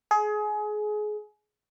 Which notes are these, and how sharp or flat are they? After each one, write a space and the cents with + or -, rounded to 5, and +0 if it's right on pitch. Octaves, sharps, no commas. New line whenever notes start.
G#4 +25